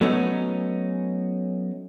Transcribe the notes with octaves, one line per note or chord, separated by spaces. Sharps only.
F#3 A3 B3 C#4 D#4